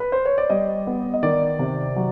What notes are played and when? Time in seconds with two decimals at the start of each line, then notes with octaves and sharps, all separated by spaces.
0.00 B4
0.12 C5
0.25 C#5
0.38 D5
0.50 G3 D#5
0.87 B3
1.14 D#5
1.23 D#3 D5
1.59 C3
1.96 F#3